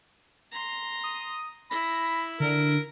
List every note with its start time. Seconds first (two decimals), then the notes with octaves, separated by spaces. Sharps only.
0.52 A#5 C6
1.03 D#6
1.71 E4 B5 A#6
2.40 D3 A#4